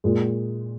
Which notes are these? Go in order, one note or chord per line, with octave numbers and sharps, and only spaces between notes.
A#2 G#3